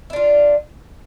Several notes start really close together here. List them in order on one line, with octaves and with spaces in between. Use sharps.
E4 D4 F4